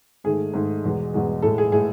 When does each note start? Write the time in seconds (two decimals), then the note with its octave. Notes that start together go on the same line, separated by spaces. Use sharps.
0.24 G#2 D#3 A3 G#4
0.53 G#2 D#3 A3
0.84 E2 B2 G#3
1.14 E2 B2 G#3
1.42 A2 G#3 A4
1.58 G#4
1.72 A2 G#3 G#4